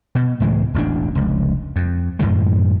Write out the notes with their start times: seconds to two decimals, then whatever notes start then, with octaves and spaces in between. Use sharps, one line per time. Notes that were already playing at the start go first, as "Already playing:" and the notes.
0.15 B2
0.40 C#2 A2 E3 G#3
0.74 E1 A1 B2 D4
1.15 F1 C#2
1.76 F2
2.19 F#2 A2 D#3 G#3